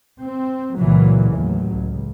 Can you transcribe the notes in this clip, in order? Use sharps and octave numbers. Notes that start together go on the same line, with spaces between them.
C4
C#2 A#2 C#3 E3 F#3
A1 D#2 F#3
C#2